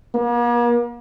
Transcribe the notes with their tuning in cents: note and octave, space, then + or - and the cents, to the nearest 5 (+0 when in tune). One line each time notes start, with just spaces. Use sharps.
A#3 +45